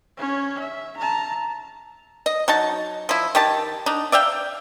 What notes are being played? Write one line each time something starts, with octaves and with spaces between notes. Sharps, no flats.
C#4 C#5
E5
A5 A#5
D#5
F#3 D#4 A5
F3 E4
D#3 G4 A5
D4 D#4
D5 E5 F5 G5